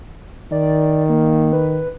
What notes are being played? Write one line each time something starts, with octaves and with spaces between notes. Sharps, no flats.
D#3 D5
A#3
B4